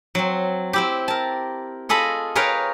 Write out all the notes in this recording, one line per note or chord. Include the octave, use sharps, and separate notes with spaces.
F#3 C4
C4 E4 G4
A#4 A5
F4 G#4 A4 D#5 B5
G#4 A#4 B4 C#5 F5 G5